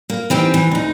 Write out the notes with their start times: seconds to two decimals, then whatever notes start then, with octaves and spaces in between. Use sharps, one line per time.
0.10 A#3
0.30 E3 C4 D#4 G4
0.54 E3
0.71 D2 D#4